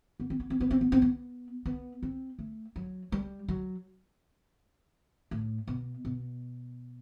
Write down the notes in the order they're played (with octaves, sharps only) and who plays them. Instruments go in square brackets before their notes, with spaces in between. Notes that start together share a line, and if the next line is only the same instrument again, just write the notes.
[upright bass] B3
C4
B3
C4
B3
C4
B3
C4
B3
B3
C4
A3
F#3
G3
F#3
A2
B2
B2